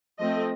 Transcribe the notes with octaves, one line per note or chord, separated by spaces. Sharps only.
F3 A3 C4 D#5